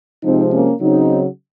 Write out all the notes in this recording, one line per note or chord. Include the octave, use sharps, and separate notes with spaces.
C3 F3 G#3 C4 D#4
A#3 C#4
C#3 F#3 C4 D#4